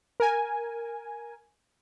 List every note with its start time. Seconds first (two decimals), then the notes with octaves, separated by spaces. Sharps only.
0.20 A#4 G#5